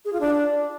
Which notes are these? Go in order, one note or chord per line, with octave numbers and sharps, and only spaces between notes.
G#4
F4
D4